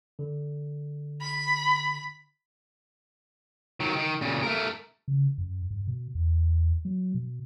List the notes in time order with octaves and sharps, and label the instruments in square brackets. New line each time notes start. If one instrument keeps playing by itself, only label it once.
[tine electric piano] D3
[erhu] B5
[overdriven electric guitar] D#3 F#3
D#3
A#2 C#3
A3 A#4
[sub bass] C#3
F#2
G2
B2
E2
F#3
B2